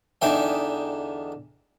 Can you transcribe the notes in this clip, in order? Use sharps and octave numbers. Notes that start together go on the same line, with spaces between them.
E2 D3 D#4 E5 G5 G#5